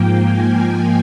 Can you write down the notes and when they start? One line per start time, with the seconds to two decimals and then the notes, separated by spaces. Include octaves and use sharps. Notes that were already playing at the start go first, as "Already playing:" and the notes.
Already playing: G#2 F3 A#3 G5
0.24 G#5